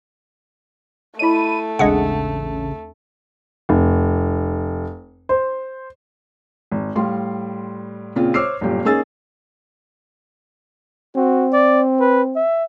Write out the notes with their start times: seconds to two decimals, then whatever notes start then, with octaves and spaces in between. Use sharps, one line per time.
1.19 A3 E4 C#5 D#5 B5 D#7
1.79 A1 D#2 C#3 G#3 D4 G#4 F#5
3.69 F1
5.29 C5
6.72 G#1
6.96 A2 G3 F5 C6
8.16 A#2 C#3 C4 F4
8.34 C5 C#5 D6 E6 F6 C7
8.61 G1 F#2 A#2 G4
8.85 A#3 C#4 D#4 G#4 E6 A6
11.16 C4 F#4
11.53 D5
12.00 B4
12.35 E5